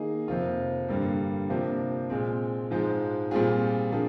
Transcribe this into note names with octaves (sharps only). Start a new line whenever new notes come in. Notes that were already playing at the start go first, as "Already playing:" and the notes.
Already playing: D#3 A#3 D#4 G#4
F2 C3 F3 A#3 F4
G2 D3 G3 A#3
C3 F3 A#3 D4 G4
A#2 G#3 C4
G#2 F3 G#3
A#2 G3 C4 F4 G#4
F3 A#3 D4 G#4